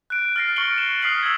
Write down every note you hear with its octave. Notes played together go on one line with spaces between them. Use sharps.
F#6 D7
F6 A6 A#6 C7
C#6 F6 C#7 D7 F#7 G7
A6 E7
D#6 F6 B6 C7 F#7 G7
E6 G#6